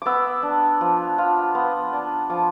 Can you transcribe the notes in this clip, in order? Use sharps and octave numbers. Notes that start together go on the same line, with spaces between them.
B3 D6 E6
D4
F3
F4
B3
D4
F3 D6